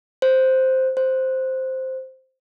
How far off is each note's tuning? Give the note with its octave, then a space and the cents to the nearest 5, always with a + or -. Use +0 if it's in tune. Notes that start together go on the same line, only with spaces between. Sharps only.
C5 +0
C5 +0